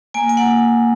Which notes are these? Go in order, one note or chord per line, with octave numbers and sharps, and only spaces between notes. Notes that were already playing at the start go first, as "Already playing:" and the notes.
A#3 G#5
G#5
A#3 F#5